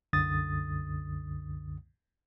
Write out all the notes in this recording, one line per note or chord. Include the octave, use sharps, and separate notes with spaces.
C2 F#2 D3 D#6 A6